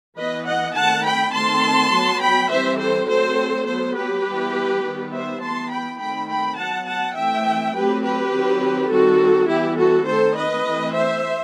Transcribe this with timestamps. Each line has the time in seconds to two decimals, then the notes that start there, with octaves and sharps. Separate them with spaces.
0.18 E3 B3 B4 D#5
0.47 D#5 F#5
0.77 D#3 A3 C4 F#5 A5
1.06 G5 B5
1.34 D#3 A3 C4 A5 C6
1.93 F#3 B3
2.22 G5 B5
2.50 E3 G3 C4 C5 E5
2.80 A4 C5
3.09 F#3 A3 C4 A4 C5
3.67 F#3 B3 A4 C5
3.96 G4 B4
4.25 E3 G3 B3
4.83 D#3 G3 B3
5.12 C5 E5
5.41 E3 B3 A5 C6
5.70 G5 B5
5.99 D#3 A3 C4 G5 B5
6.29 G5 B5
6.57 F#3 B3 F#5 A5
6.87 F#5 A5
7.15 E3 A3 C4 E5 G5
7.74 F#3 A3 C4 G4 B4
8.03 G4 B4
8.32 D#3 F#3 C4
8.90 D#3 G3 C4 F#4 A4
9.48 E3 G3 B3 E4 G4
9.78 F#4 A4
10.06 D#3 A3 C4 A4 C5
10.36 B4 D#5
10.65 E3 A3 C4
10.94 C5 E5